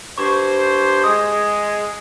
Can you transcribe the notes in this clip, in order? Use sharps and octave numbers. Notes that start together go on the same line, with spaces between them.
G2 C5 C#6
G#3 D#6